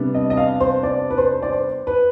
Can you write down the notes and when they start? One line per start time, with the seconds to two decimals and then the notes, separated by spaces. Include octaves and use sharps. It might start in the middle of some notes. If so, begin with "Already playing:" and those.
Already playing: C3 G3 B3 D4
0.14 D#5
0.30 D#5
0.37 F5
0.61 C5
0.83 D5
1.10 B4
1.18 C5
1.42 D5
1.52 C5
1.87 B4